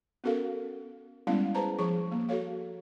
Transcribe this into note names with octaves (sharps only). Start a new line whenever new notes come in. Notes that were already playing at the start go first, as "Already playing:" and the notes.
B3 C#4 F#4 A4 A#4 F5
G3 G#3 B3 C#4 E4 F5
G#4 B4 C5 A5 A#5
F3 G#4 C#6
A#3
F#4 A4 C#5 F5